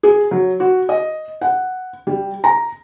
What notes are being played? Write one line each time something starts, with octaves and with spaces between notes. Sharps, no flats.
G#4
F#3
F#4
D#5
F#5
G3
A#5